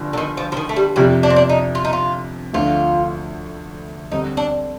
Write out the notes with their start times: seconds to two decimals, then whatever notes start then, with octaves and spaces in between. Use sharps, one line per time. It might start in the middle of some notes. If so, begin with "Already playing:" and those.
Already playing: G1 G2 F3
0.13 D3
0.18 D#3
0.37 F3
0.52 F3
0.57 D#3
0.69 A3
0.76 G3
0.96 F2 C3 F3 G3
1.23 D4
1.30 C4
1.36 D4
1.49 D#4
1.75 F4
1.85 D#4
1.93 F4
2.53 D2 D3 F3 A3 F4
4.11 D2 D3 G3 C4 D#4
4.37 D4